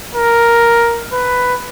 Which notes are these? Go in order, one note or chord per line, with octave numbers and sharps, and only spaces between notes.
A#4
B4